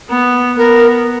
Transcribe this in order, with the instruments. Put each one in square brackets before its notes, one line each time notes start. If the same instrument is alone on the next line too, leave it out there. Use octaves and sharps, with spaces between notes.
[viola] B3
[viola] B3 [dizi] A#4